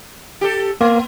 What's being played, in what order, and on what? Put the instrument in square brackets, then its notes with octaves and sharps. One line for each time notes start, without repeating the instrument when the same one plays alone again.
[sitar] G4 A4
[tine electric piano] A#3 [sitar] B3